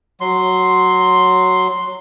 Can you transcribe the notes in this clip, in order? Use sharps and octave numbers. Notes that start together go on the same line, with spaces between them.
F#3 C6